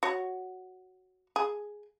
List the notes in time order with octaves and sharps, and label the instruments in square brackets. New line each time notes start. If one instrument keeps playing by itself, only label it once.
[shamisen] F#4 C#5
G#4